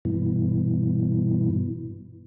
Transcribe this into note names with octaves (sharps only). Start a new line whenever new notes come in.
G2 B2 E3